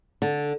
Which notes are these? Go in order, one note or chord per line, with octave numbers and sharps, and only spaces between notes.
D3